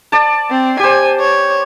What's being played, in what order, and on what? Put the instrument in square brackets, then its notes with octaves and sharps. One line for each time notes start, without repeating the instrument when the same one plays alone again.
[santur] D5 A5
[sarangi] C4
[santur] G4 C5 [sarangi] G#5
[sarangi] C#5